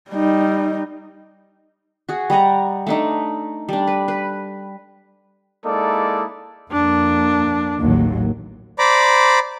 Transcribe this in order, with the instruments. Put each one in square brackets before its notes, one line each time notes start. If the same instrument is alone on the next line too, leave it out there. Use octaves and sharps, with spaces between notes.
[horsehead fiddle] G3 D#4
[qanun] F#4 G#4
G3 D#5 F#5 A#5
A3 D4 D#4
G3 D4
B4
B4
[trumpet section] G#3 A#3 D#4 E4 A4 D5
[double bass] F2 A#3 [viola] D4
[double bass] A1 F#3 [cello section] D#2
[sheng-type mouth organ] C5 D5 A#5 B5 D6